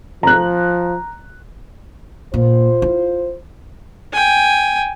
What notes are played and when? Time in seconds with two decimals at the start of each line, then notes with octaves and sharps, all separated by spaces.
0.23 F3 A#5 F#6
2.34 A#2 F4 C5
2.82 E4
4.13 G5 G#5